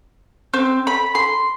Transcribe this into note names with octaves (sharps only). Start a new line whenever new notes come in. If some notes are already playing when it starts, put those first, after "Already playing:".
C4
B5
C6